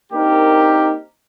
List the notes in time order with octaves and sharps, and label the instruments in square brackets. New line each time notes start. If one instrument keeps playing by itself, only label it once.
[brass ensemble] A#3 C4 D4 D#4 G4 A#4